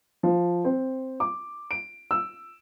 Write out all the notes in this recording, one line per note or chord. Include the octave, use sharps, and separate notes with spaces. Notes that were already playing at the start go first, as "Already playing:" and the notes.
F3
C4
D6
D7
E6